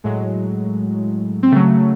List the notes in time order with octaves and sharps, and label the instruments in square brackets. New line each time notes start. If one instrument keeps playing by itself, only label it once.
[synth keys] A2 F#3 G#3
C4
C#3 F#3 A3